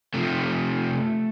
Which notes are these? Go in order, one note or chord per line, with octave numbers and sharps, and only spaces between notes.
C3 F3 A3